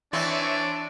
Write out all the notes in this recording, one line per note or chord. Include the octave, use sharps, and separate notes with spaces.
E3 C4 D4 C#5 D5 E5